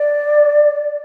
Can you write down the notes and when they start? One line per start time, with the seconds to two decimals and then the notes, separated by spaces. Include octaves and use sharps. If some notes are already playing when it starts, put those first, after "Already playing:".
Already playing: D5